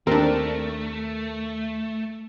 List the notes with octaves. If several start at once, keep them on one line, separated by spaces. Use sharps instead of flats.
D#2 A3 C4 D4 A#4